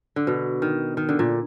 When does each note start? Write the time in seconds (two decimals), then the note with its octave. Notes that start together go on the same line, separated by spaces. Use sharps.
0.16 D3
0.27 B2
0.62 D#3
0.97 D#3
1.09 D3
1.19 A#2